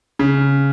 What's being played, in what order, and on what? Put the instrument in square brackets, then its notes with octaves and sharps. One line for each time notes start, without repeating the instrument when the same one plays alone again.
[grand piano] C#3